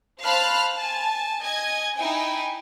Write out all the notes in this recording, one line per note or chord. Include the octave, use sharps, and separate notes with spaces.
C5 F5 A5 B5 F6 F#6
G#5 A5
D#5 G#5 G#6
D#4 E4 G5 G#5